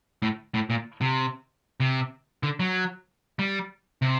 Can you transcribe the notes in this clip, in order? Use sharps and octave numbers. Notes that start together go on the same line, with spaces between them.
A2
A2
A#2
C3
C3
D3
F#3
G3
C3